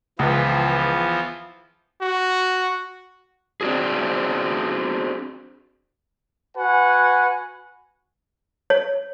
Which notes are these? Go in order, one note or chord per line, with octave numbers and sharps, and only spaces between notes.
C#2 E3 F3 B3
F#4
C4 D4 F#4 G#4
F#4 B4 F#5 G#5
C#5